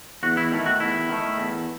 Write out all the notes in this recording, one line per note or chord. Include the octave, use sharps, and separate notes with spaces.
E2 F#4
E4
D#3 A3 E4
F#4
E2 E4
D#3 A3
E2